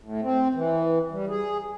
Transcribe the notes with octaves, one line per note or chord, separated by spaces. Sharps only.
A2
C4
E3
G3
G#4